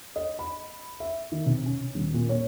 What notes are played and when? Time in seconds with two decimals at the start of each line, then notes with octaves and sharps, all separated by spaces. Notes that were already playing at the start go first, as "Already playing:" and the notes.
0.16 D#5
0.39 B5
1.00 E5
1.32 D#3
1.46 C3
1.66 C#4
1.95 D#1
2.14 A#2
2.29 C#5